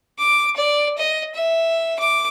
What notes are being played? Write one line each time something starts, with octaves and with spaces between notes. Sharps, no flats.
D6
D5
D#5
E5
D6